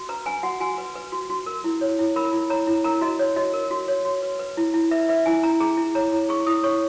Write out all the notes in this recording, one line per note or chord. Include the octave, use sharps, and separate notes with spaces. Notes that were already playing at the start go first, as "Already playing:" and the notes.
Already playing: F#4
B4 A#5
B4 G#5
F#4 F#5
F#4 G#5
B4
B4
F#4
F#4
A#4
E4
C#5
E4
A#4 B5
E4
C#5 A#5
E4
A#4 A#5
F#4 D#5
C#5
F#4 D#5
A#4
F#4
C#5
F#4
B4
B4
E4
E4
B4 E5
B4 E5
E4 G#5
E4 A#5
G#4 A#5
E4
C#5 A#5
E4
G#4 C#6
E4 D#6
C#5 C#6